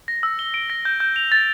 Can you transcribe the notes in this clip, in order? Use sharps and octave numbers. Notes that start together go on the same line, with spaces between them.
A#6
E6
G7
D7
A#6
G6
G6
F7
A6